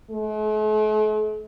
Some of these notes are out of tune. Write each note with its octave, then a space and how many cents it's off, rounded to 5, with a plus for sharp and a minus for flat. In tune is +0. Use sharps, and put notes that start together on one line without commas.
A3 -45